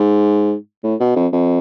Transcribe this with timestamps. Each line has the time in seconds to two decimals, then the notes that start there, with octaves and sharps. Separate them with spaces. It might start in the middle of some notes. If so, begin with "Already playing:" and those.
Already playing: G#2
0.84 A2
1.00 B2
1.16 F2
1.33 F2